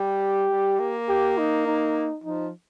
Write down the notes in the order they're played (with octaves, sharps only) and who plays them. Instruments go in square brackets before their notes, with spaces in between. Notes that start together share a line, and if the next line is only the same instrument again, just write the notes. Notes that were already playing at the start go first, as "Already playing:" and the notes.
Already playing: [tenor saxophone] G3 [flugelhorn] G4
[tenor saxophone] G3
A#3
[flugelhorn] G4
D#4
D#4
[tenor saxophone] F3 [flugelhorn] D#4